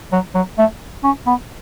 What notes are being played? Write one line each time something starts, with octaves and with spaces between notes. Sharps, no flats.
F#3
F#3
A3
C#4
B3